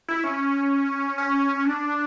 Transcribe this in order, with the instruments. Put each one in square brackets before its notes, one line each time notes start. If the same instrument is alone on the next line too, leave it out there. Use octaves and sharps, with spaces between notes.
[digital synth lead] E4
C#4
C#4
D4